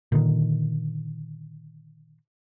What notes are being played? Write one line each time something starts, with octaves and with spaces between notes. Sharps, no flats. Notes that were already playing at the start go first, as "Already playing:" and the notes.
A#2 D3 D#3